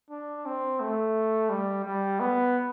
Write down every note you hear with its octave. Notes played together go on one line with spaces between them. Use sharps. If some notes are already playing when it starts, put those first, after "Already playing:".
D4
C4
A3
G3
G3
B3